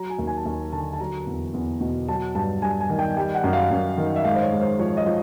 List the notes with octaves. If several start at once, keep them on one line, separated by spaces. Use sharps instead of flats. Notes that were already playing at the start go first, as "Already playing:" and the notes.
Already playing: F#3 A#5
G#5
D#2
G#5
A5
D#2 G#5
D3 A5
A5
F#3 A#5
E2
E2
B2
F#3 A5
G2 A5
G2 G#5
G#5
D#3
G5
G3 G5
F#5
F#2
F5
F#2
D#3
E5
G#2 F5
C5
C#5
G#2
C5
F3 C#5
D#5
F3